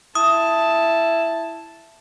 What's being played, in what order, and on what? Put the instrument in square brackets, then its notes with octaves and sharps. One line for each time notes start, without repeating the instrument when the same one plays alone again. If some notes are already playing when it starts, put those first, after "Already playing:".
[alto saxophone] E4 [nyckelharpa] A5 [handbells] D#6